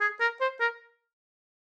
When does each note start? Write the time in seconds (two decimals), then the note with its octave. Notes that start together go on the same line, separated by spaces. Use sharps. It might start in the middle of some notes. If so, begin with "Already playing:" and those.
0.01 G#4
0.21 A#4
0.41 C5
0.61 A#4